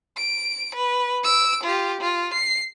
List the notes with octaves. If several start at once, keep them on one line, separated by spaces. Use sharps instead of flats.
D7
B4
E6 D7
F4 G4
F4
C7